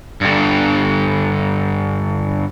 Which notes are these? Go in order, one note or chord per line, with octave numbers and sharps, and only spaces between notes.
G2 D3